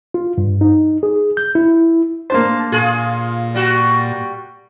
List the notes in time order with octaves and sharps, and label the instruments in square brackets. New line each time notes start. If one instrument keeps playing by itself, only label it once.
[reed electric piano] F4
G2
D#4
G#4
G6
E4
[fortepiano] A#3 D4 C5 [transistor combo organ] A5
[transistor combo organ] A#2 [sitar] F4 G#4
[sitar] G3 F#4